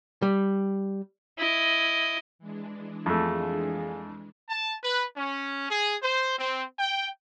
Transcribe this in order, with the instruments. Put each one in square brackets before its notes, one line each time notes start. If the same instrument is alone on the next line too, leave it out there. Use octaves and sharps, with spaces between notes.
[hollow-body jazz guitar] G3
[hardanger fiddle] E4 D#5
[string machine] E3 G#3 D4
[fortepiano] F2 A3 [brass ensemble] A#3 F4 G#4
[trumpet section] A5
B4
C#4
G#4
C5
C4
G5